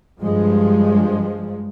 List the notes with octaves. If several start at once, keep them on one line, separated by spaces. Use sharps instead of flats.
G2 F3 G#3